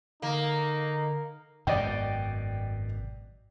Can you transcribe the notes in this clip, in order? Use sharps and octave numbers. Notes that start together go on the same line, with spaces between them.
D3 A#3 D#4
G#1 F#2 B2 D5 D#5 G5